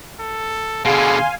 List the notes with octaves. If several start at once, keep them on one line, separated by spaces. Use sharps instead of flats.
A4
B2 D3 G#4 F5 G#5 C6